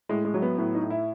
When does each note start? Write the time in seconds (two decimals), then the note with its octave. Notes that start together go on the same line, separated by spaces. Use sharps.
0.09 A2 G#3
0.25 G#3
0.34 F#3
0.42 B3
0.58 A2 B3
0.75 D#4
0.83 A2
0.90 E4